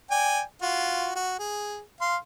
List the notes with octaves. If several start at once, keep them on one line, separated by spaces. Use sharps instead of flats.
D5 G5 G#5
F4 F#4
F#4
G#4
F5 C6